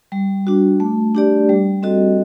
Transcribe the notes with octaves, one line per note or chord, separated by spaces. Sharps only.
G3
D4 F#4
A3
D4 G4 D5
G3
C4 F#4 A4 D#5